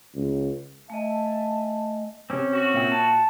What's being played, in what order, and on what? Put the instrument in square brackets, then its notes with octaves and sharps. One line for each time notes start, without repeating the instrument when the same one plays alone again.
[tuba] C#2
[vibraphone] A3 D#5 [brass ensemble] E5 G#5 A5
[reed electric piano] C3 D6 [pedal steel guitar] C4 C#4
[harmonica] F#4
[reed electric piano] A#2 E5 G5
[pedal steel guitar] A5